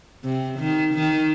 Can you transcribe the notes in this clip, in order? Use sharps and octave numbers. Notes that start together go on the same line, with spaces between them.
C3
D#3
D#3